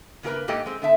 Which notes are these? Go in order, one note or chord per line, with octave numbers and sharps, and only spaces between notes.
C#3 A#3 F4 G#4 A#4 B4
G#2 A#3 G4 A4 D#5 G5
G#3 C4
D3 B3 E5 A5